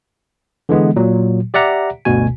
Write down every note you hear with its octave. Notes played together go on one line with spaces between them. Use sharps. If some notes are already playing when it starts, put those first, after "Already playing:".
D3 E3 G#3 B3
A#2 F#3
G4 D5 E5 F#5 A#5
G1 D2 B2 F#4 G#5